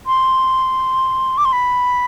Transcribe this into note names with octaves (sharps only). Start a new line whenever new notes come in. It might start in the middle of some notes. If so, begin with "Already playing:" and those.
C6
D6
C6
B5